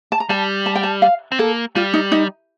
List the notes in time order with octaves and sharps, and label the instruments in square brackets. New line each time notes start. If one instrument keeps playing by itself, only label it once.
[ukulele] A5
A#5
[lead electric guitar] G3 [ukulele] A5
[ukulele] A5
G5
A5
F5
[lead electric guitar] C4
[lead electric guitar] A#3 [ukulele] A4
[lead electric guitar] G3 [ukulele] F4
[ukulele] D#4
D#4